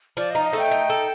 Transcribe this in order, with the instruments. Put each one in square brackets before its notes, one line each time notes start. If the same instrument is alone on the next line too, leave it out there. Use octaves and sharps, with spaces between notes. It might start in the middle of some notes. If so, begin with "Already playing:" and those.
[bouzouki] F3 [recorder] D5
[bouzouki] D#4 [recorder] D#5
[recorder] D#5
[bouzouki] A3
[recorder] G5
[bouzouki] D#4
A4